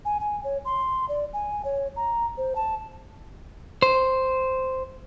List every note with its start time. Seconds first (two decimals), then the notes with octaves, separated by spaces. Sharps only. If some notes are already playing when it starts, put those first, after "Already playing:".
0.05 G#5
0.20 G#5
0.44 C#5
0.65 C6
1.09 D5
1.33 G#5
1.65 C#5
1.96 A#5
2.38 C5
2.55 A5
3.82 C5